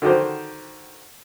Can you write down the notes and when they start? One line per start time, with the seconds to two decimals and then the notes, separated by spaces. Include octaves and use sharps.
0.02 D3 D#3 F#4 G4 C5